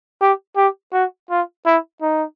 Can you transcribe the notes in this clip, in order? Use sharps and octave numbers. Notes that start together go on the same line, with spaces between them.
G4
G4
F#4
F4
E4
D#4